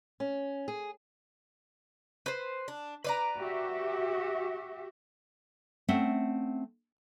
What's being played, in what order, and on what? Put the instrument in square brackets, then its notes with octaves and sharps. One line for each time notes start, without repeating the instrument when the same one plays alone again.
[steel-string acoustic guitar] C#4
G#4
[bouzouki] B4 C5
D4
B4 D5 A#5
[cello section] F#4 G4 E5
[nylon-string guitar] A3 C4 C#4 E5 F#5